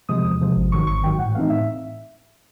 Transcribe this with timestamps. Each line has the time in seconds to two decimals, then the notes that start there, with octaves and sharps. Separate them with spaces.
0.09 C3 F3 G#3 D#6
0.24 E2
0.41 C3 F3 G#3
0.56 G#1
0.72 G#2 D#3 F#3 C#6
0.87 G#1 C#6
1.04 G#2 D#3 F#3 G5
1.19 A2 F#5
1.35 E3 A3 C4 D#4 F5
1.50 A2 E5